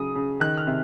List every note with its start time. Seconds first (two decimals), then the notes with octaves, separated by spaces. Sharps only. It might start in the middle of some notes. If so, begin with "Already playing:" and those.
Already playing: C#3 F#3 D#6
0.15 C#3
0.40 D#3 F#6
0.57 F6
0.67 C3